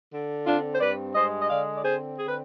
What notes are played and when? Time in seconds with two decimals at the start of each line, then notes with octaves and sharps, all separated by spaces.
0.12 D3
0.46 C4 D4 F4
0.74 C5
0.81 G2 B4 D5
1.15 G#3 C5 D#5
1.42 D#5
1.50 D3 D5 F5
1.77 D5
1.84 C4 G#4 C5
2.19 D3 G#4
2.28 B4